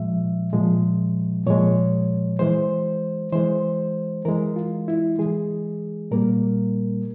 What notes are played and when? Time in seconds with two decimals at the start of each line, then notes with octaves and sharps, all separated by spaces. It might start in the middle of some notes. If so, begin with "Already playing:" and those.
Already playing: A#2 F3 G#3 E5
0.53 A#2 F3 G#3
1.46 A#2 F3 G#3 C#5
2.39 E3 G#3 C5
3.32 E3 G#3 C5
4.25 E3 G#3 A#4
4.56 F4
4.88 E4
5.19 E3 G#3 G#4
6.11 A#2 G3 A#3 A#4